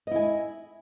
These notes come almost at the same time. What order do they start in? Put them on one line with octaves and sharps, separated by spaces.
D#5 E4 G#5